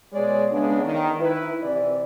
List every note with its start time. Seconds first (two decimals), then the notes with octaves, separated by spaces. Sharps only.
0.12 B2 G#3 G#4 C#5 D5
0.51 C#3 G#3 B3 D4
0.82 D#3
1.20 E4 B4
1.62 C3 E3 D5